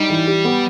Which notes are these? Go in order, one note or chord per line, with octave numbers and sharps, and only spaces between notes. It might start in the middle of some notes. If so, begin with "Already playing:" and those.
Already playing: G3 D#4
E3
G4
B3